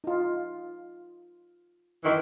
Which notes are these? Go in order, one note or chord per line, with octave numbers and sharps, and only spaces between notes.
D#4 F4
F#2 D#3 E3